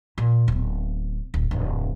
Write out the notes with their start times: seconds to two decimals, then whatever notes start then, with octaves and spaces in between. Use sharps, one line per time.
0.18 A#2
0.48 D1 B3
1.34 D1
1.51 D1 F2